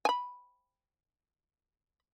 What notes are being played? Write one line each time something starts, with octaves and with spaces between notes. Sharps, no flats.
G#5 B5